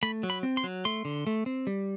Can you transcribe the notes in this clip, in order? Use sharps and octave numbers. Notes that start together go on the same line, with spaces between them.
A3 B5
F#3
B5
C4
C6
F#3
A3 C6
D3
A3
C4
G3